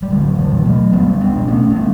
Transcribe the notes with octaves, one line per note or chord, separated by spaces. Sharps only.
G3
C#2 D3 F#3
E3 G3
B2
F#3 A3
C#2 G3 B3
B3 D4
B2
A3 C#4
C#4
G3 B3